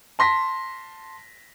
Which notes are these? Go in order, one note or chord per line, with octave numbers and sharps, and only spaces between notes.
A5 C6 A#6 B6